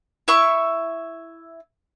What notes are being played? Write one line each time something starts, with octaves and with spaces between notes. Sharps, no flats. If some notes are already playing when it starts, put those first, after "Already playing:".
E4 E5 C#6